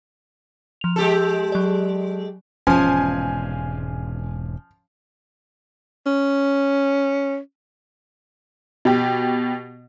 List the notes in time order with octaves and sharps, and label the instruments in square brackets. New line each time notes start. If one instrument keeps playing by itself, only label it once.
[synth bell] F3 F7
[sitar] G#3 G4 A4
[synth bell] F#3 D5
[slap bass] E1 G#2 C3 [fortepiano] F3 [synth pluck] C#4 F5 [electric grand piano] G#5
[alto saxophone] C#4
[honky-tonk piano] B2 G4